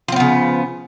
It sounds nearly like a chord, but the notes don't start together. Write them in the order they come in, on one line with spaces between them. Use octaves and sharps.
F3 C4 B3 C#3